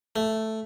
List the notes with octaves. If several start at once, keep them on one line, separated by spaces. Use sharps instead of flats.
A3